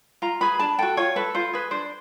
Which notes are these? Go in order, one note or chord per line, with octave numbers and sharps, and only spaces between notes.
F4 A#5
G#4 B4 B5
D4 A5
F#4 A4 G5
F4 C#5
A4 B4
F4 C5
G#4 B4
D4 C5